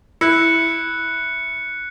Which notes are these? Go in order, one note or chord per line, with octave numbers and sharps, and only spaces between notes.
E4 F#6 C#7